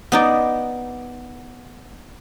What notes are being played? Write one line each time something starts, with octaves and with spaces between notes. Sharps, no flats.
B3 D#4 D5